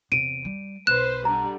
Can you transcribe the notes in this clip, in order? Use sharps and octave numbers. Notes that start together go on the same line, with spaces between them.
E2 C3 D7 D#7
G3
B1 B4 C5 F#6 E7
D3 G3 A#5